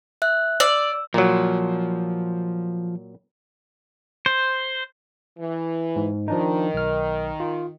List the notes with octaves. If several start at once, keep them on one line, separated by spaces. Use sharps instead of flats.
E5 F#6
D5 E6
A#2 F3 F#3
C5
E3
G#2
D#3 F3 D4 D#4
B1 F6
F4